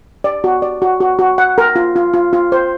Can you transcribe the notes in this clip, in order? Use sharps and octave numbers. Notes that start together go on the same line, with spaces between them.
D5
F#4
D5
F#4
F#4
F#4
F#5
A#4
F4
F4
F4
F4
C5